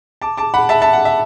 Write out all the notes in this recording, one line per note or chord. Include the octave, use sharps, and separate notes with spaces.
A5 D6
A5 D6
F#5 B5
E5 A5
E5 A5
F#5
E5